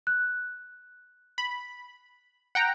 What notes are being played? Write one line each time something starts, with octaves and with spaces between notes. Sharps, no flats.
F#6
B5
F#5 G5 A#5